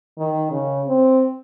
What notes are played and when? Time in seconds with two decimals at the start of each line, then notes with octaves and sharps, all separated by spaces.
0.18 D#3
0.51 C#3
0.87 C4